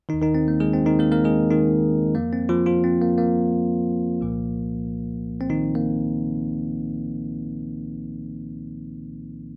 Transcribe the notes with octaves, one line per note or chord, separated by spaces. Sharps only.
D#2 D#3 D#4
D#3 D#4
C4
A#3
G#3 G#4
C4
D#3 D#4
A#3 A#4
A#3 A#4
G#3 G#4
D#3 D#4
F2 F3 A#3
C4
F3 F4
F3 F4
C4
A#3
A#3
C2 A#2 F3
C4
D#3 D#4
A#3